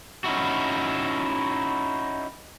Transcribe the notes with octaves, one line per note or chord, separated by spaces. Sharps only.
C#4 D#4 E4 F#4